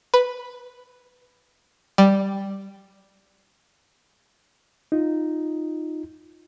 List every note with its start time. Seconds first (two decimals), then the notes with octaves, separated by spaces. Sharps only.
0.14 B4
1.98 G3
4.92 D#4 F4